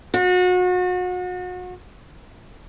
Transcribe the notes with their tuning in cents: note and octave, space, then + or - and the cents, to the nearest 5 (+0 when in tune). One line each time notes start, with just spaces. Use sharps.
F#4 -35